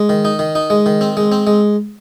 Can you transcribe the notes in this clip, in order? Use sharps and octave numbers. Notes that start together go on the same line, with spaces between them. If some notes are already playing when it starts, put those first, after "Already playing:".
Already playing: G#3
D#3
D#4
D#3
D#4
G#3
D#3
C4
G#3
C4
G#3